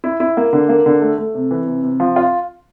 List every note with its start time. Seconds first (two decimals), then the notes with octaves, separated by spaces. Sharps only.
0.04 E4
0.20 E4
0.37 A#3
0.53 D3
0.69 A#3
0.86 D3
1.02 A3
1.18 A3
1.35 C3
1.51 E3
1.66 C3
1.83 C3
2.00 F3
2.16 F4